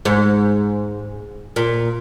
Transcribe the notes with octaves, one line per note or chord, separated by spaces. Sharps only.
G#2
A#2